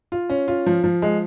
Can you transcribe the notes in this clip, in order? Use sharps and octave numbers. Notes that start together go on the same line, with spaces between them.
F4
C#4
F4
F3
F3
G#3